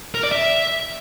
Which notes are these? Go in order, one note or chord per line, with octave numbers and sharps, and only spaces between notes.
A#4
D5
E5